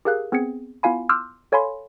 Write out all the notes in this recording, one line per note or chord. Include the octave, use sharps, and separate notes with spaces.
G4 G#4 A#4 F5 F#6
B3 C4 G#4 G#6 C#7
B3 E4 F4 F5 G#5 B5
C6 D6 E6 F6 G6
A4 C#5 F5 G#5 B5 C6